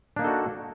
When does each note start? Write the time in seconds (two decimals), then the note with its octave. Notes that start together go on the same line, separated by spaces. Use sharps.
0.16 D4
0.19 A#3
0.22 D#4
0.24 A4
0.27 F#4